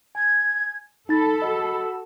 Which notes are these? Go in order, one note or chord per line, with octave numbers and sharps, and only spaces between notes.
G#5 G#6
D#4 A4 B5 A6
F#4 D#5 E6